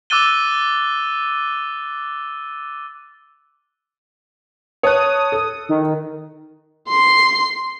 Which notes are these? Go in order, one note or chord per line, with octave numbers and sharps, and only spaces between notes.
D6 E6 F#6 A6 D#7 G7
C#5 A5 D#6 F#6
A4
D#3
C6 C7